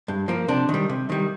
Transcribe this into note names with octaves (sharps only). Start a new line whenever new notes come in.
G2
F3 A#3
C3 D4
D#3
G3
C3
D#3 G3